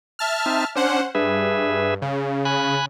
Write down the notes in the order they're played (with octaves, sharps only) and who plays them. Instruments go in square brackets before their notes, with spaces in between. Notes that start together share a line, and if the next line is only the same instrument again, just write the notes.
[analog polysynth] E5 A5 F6
[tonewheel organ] C4 D#4
[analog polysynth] C#4 C5 F#5 [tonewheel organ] D4
[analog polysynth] G2 [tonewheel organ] G#4 B4 E5
[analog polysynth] C#3
[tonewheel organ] G#5 B5 F#6